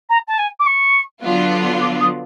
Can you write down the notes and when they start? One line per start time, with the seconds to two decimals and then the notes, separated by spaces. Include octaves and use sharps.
0.09 A#5
0.28 A5
0.38 G#5
0.59 D6
0.66 C#6
1.23 D3 F#3 B3 D4 F4
1.81 D6
2.00 D#6